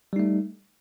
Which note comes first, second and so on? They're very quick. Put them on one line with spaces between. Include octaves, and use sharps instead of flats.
G3 D#4 A3